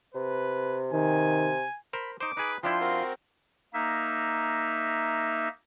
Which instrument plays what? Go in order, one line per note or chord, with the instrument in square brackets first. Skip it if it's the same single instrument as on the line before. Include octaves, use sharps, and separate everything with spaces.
[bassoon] C3 [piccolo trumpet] B4
[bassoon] C3 [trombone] D#3 [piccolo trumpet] G#5
[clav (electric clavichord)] A#4 C5 [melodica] B5
[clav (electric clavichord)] D#4 C5 [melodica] D6
[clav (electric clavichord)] D#4 G#4 [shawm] B4
[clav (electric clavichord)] F3 D4 E4 [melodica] F4 [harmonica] G5 [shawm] C6
[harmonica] C4 F#4 A#4
[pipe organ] A#3 D#4 E5